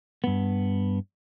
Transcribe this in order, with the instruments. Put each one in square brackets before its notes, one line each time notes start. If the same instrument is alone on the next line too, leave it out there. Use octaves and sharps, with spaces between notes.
[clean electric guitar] G2 B3